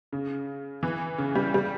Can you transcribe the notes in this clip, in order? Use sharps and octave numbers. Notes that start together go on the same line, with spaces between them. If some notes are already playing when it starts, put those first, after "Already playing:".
C#3
E3
C#3
G3
G3